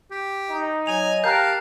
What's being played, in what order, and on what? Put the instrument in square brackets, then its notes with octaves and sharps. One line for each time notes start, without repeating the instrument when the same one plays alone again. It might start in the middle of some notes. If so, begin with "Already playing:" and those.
[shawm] G4
[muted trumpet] D#4
[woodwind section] F#3 D#5 [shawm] G#5 [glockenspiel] F7
[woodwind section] G4 G5 A5 [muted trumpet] A#4 [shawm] F5 [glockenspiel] F#6 G6